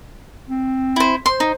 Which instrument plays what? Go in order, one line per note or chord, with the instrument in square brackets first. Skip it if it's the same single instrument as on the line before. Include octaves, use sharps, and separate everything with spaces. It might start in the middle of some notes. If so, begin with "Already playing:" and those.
[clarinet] C4
[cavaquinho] E4 C5
[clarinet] C5 [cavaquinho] C6
[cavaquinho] D#4